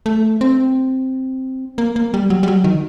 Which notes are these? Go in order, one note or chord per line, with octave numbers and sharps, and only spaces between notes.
A3
C4
A#3
A#3
G3
F#3
G3
F#3
D#3